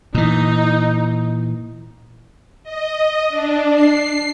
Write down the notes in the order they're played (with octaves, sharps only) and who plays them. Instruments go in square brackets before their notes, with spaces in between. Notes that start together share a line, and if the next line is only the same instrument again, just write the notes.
[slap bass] A#2 E3 [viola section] D#4
[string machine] D#5
D4
C7